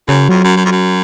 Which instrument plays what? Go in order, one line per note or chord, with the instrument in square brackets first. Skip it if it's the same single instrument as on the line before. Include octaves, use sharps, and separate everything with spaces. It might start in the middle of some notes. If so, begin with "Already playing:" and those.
[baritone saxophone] F#2 [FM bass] C#3
[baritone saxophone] F2 [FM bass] F#3
[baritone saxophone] F#2
F#2
F2
F#2